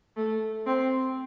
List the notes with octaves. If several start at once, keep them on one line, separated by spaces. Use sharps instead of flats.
A3
C4